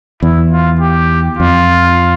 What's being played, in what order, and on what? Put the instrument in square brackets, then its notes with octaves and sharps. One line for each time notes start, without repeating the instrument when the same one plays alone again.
[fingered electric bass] E2 [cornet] E4
[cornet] F4
G4
[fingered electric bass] F2 [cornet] F4